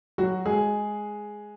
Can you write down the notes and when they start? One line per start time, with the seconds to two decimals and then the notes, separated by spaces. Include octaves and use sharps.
0.18 F#3 F#4
0.45 G#3 G#4